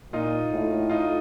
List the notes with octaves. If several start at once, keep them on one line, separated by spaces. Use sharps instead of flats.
A#2 D#4 F4
A2
D#4 F4